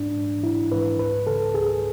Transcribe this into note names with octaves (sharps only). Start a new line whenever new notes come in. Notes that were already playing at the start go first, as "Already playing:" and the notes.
Already playing: G#2 D4
G#2
G#2 E4
G#2 B4
C#2 B4
C#3 A4
C#2 G#4